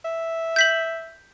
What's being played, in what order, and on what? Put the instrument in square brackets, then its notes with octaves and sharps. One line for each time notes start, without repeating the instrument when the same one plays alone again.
[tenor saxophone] E5
[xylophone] G6 B6 F#7